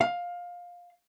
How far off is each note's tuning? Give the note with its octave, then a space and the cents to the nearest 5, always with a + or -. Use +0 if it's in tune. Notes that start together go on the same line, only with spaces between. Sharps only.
F5 +15